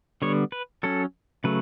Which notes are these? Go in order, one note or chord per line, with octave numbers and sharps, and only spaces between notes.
D3 G3 B3 C#5
B4
F#3 C#4 A4
C#3 F#3 A3 B4